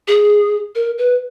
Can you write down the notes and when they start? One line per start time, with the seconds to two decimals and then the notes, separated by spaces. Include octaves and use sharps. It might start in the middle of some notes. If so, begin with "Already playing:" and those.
0.07 G#4
0.75 A#4
0.98 B4